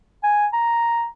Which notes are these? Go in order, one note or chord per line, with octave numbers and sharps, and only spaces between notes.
G#5
A#5